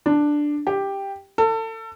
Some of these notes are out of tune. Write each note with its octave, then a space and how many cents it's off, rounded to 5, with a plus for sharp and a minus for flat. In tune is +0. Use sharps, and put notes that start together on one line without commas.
D4 +5
G4 +5
A4 +30